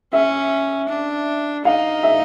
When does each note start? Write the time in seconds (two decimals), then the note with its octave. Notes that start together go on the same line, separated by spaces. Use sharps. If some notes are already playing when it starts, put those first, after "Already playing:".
0.13 C#4 E5
0.89 D4
1.65 D#4 F5
2.03 E5